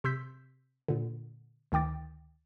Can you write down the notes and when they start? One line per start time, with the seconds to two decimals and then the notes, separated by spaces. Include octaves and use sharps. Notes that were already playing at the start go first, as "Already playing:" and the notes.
0.04 C3 C6 E6 G6 B6
0.88 A#2 D3
1.72 D2 D#3 G5 D6 A6